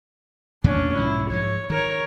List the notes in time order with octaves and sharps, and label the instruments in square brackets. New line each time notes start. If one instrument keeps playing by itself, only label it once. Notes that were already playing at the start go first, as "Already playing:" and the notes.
[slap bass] E2 A#2 A3 [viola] C#4 D4
[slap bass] B1 G#2 F3 [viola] E4
[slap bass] G#2 F3 G#3 [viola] C#5
[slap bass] D#3 [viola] A#4 C#5